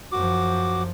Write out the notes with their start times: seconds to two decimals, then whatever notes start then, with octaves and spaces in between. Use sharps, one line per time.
0.12 F#2 F3 F#4 D6